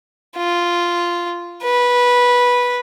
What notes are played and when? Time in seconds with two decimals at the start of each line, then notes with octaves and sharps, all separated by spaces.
0.37 F4
1.63 B4